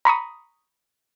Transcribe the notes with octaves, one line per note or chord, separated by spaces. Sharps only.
A#5 B5 C#6 D#6